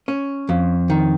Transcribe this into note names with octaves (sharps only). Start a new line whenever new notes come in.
C#4
F2
D#3